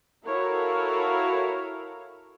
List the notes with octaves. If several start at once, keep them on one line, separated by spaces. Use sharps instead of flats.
E4 F#4 A4 A#4 C#5 F5